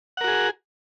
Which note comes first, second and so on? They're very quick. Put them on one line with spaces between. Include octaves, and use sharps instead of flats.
F#5 A#4 F#4 G#4